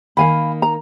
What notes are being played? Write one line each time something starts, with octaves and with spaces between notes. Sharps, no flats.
D#3 A#3 F5 G#5 B5
A#5